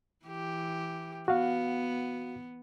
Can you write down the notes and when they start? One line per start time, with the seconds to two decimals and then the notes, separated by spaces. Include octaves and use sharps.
0.25 E3 G4
1.28 B3 F#4 F5